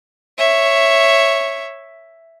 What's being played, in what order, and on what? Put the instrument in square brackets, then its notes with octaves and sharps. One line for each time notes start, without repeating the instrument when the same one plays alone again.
[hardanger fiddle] C#5 E5